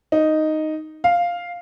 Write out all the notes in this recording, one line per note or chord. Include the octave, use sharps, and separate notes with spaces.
D#4
F5